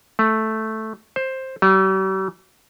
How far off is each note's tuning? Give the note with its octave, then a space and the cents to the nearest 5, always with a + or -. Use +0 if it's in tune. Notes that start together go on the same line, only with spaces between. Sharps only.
A3 -5
C5 +10
G3 -45